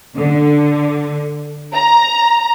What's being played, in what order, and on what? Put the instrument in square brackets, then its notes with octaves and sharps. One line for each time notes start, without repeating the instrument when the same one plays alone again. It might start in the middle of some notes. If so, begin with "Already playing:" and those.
[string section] D3
A#5